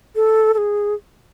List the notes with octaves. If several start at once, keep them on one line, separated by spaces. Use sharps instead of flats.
A4
A4
G#4